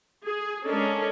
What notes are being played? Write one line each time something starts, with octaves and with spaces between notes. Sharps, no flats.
G#4
G#3 C#4 D4 A4 A#4 D#5